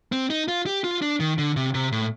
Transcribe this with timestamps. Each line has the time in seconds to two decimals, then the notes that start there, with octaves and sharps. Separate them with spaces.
0.12 C4
0.30 D#4
0.48 F4
0.66 G4
0.84 F4
1.02 D4
1.20 D#3
1.38 D3
1.56 C3
1.74 C3
1.92 A2